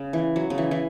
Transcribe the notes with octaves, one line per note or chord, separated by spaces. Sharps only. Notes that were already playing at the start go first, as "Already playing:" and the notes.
Already playing: C#3
E3
F#3
C#3
E3
E3